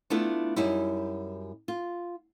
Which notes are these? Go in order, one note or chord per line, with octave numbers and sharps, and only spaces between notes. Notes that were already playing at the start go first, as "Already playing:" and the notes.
A3 B3 D4 E4 F4
F#2 G3 D#4 E4
F4